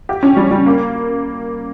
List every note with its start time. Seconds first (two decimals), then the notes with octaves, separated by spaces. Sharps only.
0.09 G4
0.23 C#4
0.37 G3
0.51 G3
0.66 A#3